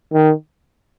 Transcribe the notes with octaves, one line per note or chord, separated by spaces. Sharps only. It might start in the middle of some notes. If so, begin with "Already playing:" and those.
D#3